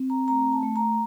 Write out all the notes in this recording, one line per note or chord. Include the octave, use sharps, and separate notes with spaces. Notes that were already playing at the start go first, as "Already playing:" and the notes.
Already playing: C4
A#5
A3 A#5
A5
A3
A#5